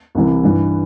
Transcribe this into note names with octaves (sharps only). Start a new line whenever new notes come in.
C2 C3 E3
G2 E3